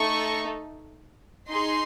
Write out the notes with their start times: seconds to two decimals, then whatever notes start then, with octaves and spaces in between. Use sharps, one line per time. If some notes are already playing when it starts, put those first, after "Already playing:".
Already playing: A3 D#4 A4 C#6
1.47 D#4 G#4 C6